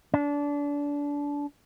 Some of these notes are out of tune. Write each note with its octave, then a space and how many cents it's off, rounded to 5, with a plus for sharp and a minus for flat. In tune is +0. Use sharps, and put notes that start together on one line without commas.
D4 -25